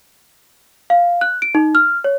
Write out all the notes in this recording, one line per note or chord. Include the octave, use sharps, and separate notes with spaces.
F5
F#6
D7
D#4
F6
C#5